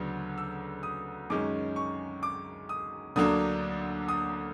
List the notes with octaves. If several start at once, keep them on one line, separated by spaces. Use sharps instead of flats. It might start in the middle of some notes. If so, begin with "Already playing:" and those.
Already playing: D2 C#3 F#3 B3 D4
E6
D#6
F#2 D#3 G#3 C#4 D6
C#6
D6
D#6
D2 D3 F#3 A#3 D4 D#6
D#6